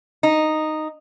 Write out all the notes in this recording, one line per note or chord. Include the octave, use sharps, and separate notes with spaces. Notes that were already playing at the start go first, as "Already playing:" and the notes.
D#4